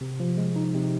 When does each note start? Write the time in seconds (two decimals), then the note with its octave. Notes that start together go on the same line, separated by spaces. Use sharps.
0.01 C3
0.20 F3
0.37 G#3
0.56 D#4
0.74 C3